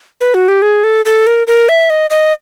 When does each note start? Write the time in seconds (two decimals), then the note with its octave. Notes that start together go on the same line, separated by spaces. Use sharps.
0.21 B4
0.34 F#4
0.48 G4
0.62 G#4
0.84 A4
1.05 A4
1.27 A#4
1.47 A#4
1.69 E5
1.90 D#5
2.10 D#5